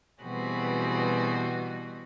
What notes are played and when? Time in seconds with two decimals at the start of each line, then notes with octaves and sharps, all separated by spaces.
0.22 B2 E3 G3 C4 F#4 G#4